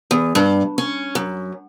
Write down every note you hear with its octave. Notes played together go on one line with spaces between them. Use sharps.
E2
G2
C#4
F#2